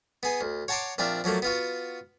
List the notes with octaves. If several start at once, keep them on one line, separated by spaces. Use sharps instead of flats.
B3 G#4
D2
C#5 F#5 A5 A#5 C6 D6
A#1 C4 D4 F4 E5
F3 F#3 A3 A#3
B3 F4 F#4